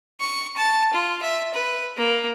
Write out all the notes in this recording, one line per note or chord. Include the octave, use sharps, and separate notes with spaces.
C#6
A5
F4
E5
B4
A#3